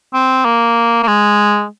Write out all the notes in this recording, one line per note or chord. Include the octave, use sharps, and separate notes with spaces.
C4
A#3
A#3
G#3